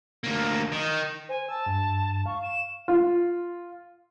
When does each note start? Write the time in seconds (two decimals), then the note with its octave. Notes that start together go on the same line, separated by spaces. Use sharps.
0.24 D2 A#3
0.72 D#3
1.29 C5 G#5
1.49 A5 E6
1.66 G2
2.26 F5 C#6
2.42 E7
2.88 F4